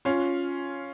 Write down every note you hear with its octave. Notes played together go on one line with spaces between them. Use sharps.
C#4 F4